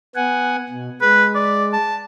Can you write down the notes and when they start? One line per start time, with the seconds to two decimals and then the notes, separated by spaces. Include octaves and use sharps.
0.16 B3 F#5 G#5
0.69 B2
1.02 G#3 B4
1.35 D5
1.73 A5